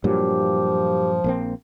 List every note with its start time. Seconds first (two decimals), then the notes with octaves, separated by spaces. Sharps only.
0.04 G2 A#2 F3 F#3 G4
1.24 A#1 A#3 C4